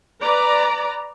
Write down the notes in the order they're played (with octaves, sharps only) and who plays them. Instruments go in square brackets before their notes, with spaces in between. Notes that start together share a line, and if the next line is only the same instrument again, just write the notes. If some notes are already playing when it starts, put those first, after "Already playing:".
[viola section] B4 D5 A#5